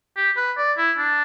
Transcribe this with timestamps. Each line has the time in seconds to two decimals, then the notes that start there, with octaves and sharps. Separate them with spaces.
0.17 G4
0.37 B4
0.58 D5
0.77 E4
0.98 D4